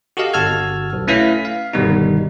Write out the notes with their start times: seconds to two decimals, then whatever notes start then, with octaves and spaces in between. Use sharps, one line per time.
0.17 F#4 G4 A4 D#5 F5
0.33 G1 F#4 A5 E6 F6 G#6
0.93 B1
1.07 A3 C#4 E4 B4 F5 B6
1.45 F5
1.73 G1 B2 D#3 G3 B3 D#4